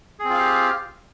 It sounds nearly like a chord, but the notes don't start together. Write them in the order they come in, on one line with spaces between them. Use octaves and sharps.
G#4 C4 F4 F5 G4